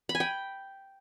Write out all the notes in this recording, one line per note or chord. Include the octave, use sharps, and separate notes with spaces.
B5
G#5
G5